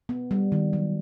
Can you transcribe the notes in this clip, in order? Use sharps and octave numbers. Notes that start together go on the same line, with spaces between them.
B3
G3
D#3
F#3